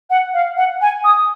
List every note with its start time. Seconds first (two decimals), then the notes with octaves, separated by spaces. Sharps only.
0.10 F#5
0.34 F5
0.57 F#5
0.81 G#5
1.04 D#6